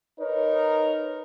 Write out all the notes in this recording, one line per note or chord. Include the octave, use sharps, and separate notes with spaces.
D#4 A#4 B4 C#5